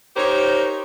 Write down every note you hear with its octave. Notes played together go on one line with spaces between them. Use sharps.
D#4 G4 A#4 C5 C#5